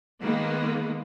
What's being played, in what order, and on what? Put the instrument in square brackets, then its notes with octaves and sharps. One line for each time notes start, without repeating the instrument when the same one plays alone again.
[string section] D#3 G#3 A#3 B3